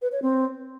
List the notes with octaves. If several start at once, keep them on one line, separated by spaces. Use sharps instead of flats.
B4
C#5
C4